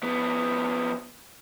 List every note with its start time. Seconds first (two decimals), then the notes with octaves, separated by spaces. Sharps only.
0.03 F2 B3